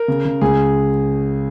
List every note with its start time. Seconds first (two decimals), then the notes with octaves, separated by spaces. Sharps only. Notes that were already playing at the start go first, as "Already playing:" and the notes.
Already playing: A#4
0.08 C#3
0.25 C#3
0.41 C#2 G#4